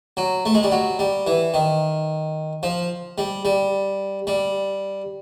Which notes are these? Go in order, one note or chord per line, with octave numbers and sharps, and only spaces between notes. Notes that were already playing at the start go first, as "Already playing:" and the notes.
F#3
A3
G#3
G3
F#3
G3
E3
D#3
F3
G3
G3
G3